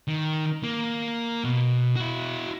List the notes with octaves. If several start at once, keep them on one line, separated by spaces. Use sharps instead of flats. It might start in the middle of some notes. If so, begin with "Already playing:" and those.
D#3
A#3
B2
E4 F#4